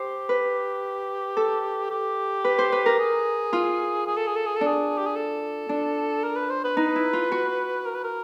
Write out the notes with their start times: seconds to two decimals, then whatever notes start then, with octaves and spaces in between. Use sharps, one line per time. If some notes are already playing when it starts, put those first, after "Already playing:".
Already playing: G4 C5
0.29 B4
1.37 A4
1.91 G4
2.44 B4
2.58 C5
2.72 B4
2.86 A#4
2.99 G#4
3.53 F4
4.06 G#4
4.17 A4
4.27 G#4
4.36 A4
4.46 G#4
4.56 A4
4.61 D4
4.66 G#4
4.98 G4
5.06 G#4
5.16 A4
5.69 D4
6.24 A#4
6.36 B4
6.50 C5
6.64 B4
6.77 D#4 B4
6.96 E4
7.13 F4
7.32 F#4
7.86 A#4
7.95 B4
8.04 A#4